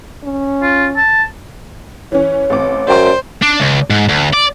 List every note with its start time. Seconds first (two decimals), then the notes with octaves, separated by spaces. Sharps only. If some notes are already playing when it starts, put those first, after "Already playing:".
0.24 C#4
0.62 F4
0.97 A5
2.12 E3 C#4 C#5
2.50 A1 C4 D6
2.88 F#2 C5 D5 G5 C6
3.42 D4
3.60 C#2
3.90 G#2
4.09 D2
4.34 D5